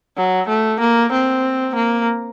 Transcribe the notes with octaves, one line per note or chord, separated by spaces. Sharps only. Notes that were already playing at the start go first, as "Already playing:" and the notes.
F#3
A3
A#3
C4
A#3